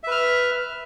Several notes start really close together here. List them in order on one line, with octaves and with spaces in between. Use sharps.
E5 B4 F6